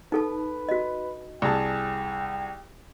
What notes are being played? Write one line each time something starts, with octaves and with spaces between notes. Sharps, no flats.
D#4 A4 B4 A5
F#4 D#5
C2 G#4 G5 A5